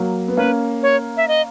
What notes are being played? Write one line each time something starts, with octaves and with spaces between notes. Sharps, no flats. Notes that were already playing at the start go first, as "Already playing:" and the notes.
Already playing: F#3 A#3
B3
A#3 C#4 B4
C#5
E5
D#5